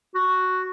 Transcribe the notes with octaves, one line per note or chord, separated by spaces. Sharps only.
F#4